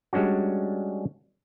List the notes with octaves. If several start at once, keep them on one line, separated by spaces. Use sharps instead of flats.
G3 G#3 C#4 D4 F#4